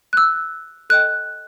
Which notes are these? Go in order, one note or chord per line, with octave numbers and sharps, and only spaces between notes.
F#6
E6
A4 D#5 G5 F#6